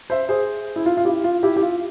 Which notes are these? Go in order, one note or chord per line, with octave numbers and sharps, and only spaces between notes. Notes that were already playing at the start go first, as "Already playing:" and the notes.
C5 E5
G#4 C5
E4
F4
F4
E4 G4
F4
E4 G4
G4
F4